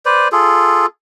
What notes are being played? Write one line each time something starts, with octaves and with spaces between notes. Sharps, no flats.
B4 C5 D5
F4 G#4 A4